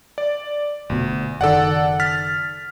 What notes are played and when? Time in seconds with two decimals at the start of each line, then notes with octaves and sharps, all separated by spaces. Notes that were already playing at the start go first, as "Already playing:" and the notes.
0.18 D5
0.90 F1 D2 B2
1.41 F#1 D#3 A4 D5 F#5
2.00 F6 A6 B6